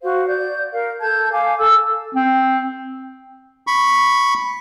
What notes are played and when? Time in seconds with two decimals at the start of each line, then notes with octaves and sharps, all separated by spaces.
0.03 F#4 C5 F5
0.27 D5 G6
0.72 A#4 F5
1.01 A4 A5 G6 G#6
1.32 F5 G#5 D6
1.58 A4 E6
2.15 C4
3.67 B5 C#6